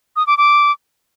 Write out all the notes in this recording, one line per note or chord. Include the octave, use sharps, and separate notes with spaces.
D#6
D6
D6